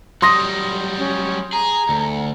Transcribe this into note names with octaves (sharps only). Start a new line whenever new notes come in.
F#3 G3 C6 D#6 A#6
C#4
G#4 A#5
D2